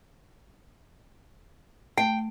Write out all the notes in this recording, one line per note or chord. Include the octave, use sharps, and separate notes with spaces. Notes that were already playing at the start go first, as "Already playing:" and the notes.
A3 G5